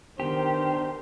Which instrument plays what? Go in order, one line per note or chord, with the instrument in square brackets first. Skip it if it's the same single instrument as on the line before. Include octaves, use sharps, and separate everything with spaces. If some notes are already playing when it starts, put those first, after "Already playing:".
[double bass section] D#3 [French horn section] B3 D4 [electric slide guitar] G4 [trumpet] C5